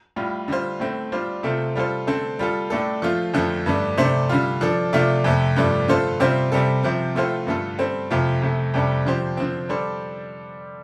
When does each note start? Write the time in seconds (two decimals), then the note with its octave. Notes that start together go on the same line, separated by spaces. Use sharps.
0.16 A2 G3 F4
0.48 D3 G3 F4 C5
0.80 A2 A3 C4
1.12 G3 D4 F4 C5
1.43 C3 A3 C4 F4 A4
1.75 G3 F4 A4 C5
2.07 D3 A3 C4 A4 C5
2.39 G3 F4 A4
2.70 A2 A3 D4 A4
3.02 F3 A3 F4
3.34 F2 D3 F3 A3
3.66 G2 D3 A3 D4
3.98 C3 A3 D4 A4 C5
4.29 D3 G3 F4
4.61 F3 D4 A4
4.93 C3 A3 D4 F4
5.24 F2 C3 A3
5.56 G2 F3 A3 D4
5.88 D3 A3 F4 A4 C5
6.20 C3 G3 C4 F4 C5
6.52 C3 G3 C4 A4
6.83 C3 F3 C4
7.15 A2 A3 F4 A4 C5
7.47 G2 D3 A3 F4 A4
7.78 G3 C4 A4 C5
8.10 F2 C3 A3 F4
8.42 F2 C3 A3
8.74 F2 C3 G3 D4 A4
9.05 D3 F3 C4 G4 C5
9.37 D3 F3 C4
9.69 G3 D4 A4 C5